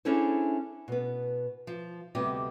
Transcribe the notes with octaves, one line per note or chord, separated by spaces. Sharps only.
C#4 D4 E4 G#4 A4 C5
B2 B3
F3
D2 C3 G3 B3 G4 D#5